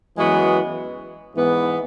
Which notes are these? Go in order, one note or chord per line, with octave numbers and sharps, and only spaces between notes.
F#2 E3 G#3 B3 F#4
G#2 E3 B3